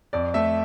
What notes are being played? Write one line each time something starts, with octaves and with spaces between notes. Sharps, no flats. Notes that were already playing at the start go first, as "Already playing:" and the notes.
F2 D5
A3 E5